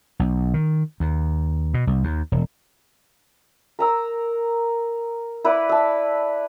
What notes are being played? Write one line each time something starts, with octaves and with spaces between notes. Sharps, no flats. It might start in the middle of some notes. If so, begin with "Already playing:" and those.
B1
D#3
D#2
B2
C2
D#2
E1
A#4 A#5 E6
E4 B4 D5 F#5
E5 A5